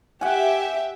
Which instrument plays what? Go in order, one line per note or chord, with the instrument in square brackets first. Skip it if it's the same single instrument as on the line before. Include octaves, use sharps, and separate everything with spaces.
[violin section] G4 E5 [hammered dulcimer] F#5 G#5